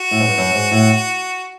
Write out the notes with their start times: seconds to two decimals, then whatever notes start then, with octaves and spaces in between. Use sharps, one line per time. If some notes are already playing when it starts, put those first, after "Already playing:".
Already playing: F#4
0.11 A2
0.20 G#2
0.28 G2
0.37 F#2
0.54 G#2
0.71 A2